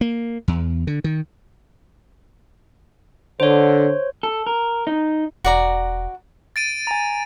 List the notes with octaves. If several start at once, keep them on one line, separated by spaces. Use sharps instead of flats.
A#3
E2
D3
D#3
D3 C5 C#5
A4
A#4
D#4
E1 F#4 D5 A#5
A6 D7 D#7
G#5 A#5